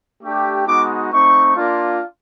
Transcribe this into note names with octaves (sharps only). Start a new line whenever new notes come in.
A3 D4 G4
G#3 B3 D#4 F#4 D6
A3 C4 D#4 C#6
A#3 D4 F4